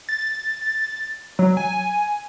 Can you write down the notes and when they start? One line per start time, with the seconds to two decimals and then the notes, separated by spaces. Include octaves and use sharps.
0.09 A6
1.39 F#3
1.57 G#5